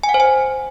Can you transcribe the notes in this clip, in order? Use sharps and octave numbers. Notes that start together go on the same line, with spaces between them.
G#5
F#5
C5
G#5